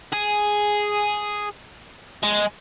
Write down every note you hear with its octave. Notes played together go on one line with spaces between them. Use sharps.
G#4
G#3